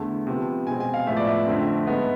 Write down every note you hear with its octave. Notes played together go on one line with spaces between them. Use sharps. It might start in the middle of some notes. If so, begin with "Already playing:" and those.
Already playing: E2 D3 A3
C3 F3 B3
B2 G#3 C4 G#5
G#5
F5
A2 F3 G#3 B3 E5
D5
E5
F2 D3 A3 C4
G#2 G#3 B3